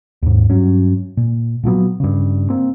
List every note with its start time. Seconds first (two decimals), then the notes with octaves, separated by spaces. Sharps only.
0.22 D#2 G#2
0.50 G2 F#3 C#4
1.17 A#2
1.63 A#2 F3 F#3 B3
2.00 G2 C#3
2.50 A#3 C4